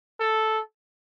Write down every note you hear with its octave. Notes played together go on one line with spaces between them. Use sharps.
A4